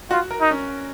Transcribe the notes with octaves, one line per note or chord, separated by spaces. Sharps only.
F4 F#4
A#4
D#4
C#4